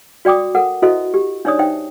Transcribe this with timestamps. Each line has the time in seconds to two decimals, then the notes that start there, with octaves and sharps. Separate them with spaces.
0.25 F#4 D5 G5 D6 D#6
0.55 A4 A#4 F#5
0.82 E4 F#4 A4 C5 D#5 E5
1.14 G4
1.45 D4 D#4 C#5 D5 D#6
1.59 D#4 C5 E5 G5